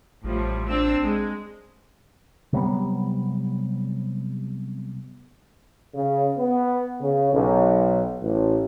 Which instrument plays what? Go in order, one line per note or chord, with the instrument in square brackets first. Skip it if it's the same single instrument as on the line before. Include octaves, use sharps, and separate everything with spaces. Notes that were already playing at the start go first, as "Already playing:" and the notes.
[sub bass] A1 [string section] A2 F3 G3
[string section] C4 D4 E6
G#3
[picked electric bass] C3 F#3 G3 B3
[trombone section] C#3
B3
C#3
B1
A1